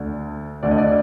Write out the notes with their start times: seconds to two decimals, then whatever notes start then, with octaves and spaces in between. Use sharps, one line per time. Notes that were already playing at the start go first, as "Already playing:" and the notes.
Already playing: D2 D3
0.63 D2 D3 D5
0.71 D#5
0.78 D5